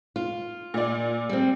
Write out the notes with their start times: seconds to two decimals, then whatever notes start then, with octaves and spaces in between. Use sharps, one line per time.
0.16 F4
0.74 A#2 D5
1.29 G3 C4